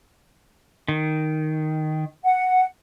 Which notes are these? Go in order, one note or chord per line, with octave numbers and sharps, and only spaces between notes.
D#3
F#5